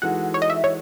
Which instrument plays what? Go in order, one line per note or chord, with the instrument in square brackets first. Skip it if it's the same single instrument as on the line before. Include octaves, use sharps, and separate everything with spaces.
[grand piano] E3 G#3 D#4 F#4 A4 [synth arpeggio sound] F#5
[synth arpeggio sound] C#5
D#5
E5
C#5